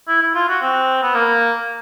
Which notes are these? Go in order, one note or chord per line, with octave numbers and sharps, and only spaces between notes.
E4
E4
F4
F#4
C4
B3
A#3